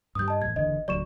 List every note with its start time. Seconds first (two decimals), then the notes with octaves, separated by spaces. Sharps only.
0.15 G2 G3 D#6 G6
0.28 D#5 A5
0.42 E2 A2 G#6
0.56 F#1 E2 D3 D#5
0.88 D#1 D2 F#3 D5 C#6 E7